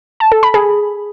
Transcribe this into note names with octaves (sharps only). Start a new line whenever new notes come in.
A5
A4
B5
G#4